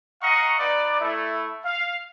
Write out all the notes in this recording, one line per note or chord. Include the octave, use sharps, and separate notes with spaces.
D#5 F5 F#5 A#5 C#6
D#4 B4 D5
A3 E4
F5